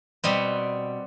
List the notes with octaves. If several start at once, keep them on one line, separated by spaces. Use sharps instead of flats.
B2 G3 B3 C4